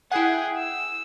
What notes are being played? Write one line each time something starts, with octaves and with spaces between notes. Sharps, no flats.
E4 G#4 F#5 G5
E6